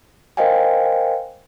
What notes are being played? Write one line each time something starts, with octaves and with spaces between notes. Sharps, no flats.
A#4 C5 D#5 F5 G5 G#5